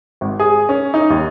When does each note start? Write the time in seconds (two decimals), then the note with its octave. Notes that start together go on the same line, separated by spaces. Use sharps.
0.21 G#1
0.39 G#4
0.69 C#4
0.94 D#4
1.10 D#2